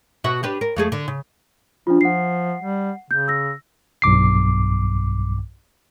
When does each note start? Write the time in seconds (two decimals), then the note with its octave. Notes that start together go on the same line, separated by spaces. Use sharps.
0.24 B2 F#4 E5
0.43 D4 G4 B4
0.61 A#4
0.77 F2 A3 G#4
0.92 D3
1.08 C#3
1.87 F3 D4 F4
2.01 F3 F#5 C7
2.62 G3
3.11 C#3 G6
3.28 E6 A#6
4.02 B1 G2 D6 C7